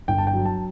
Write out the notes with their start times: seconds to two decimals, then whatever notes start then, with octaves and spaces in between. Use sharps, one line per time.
0.08 G1 G5
0.18 A5
0.27 G5
0.33 F#3
0.45 A5